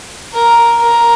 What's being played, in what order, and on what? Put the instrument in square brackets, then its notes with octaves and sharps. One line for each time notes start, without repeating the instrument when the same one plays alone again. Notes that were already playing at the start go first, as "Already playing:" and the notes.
[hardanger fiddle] A#4
A#4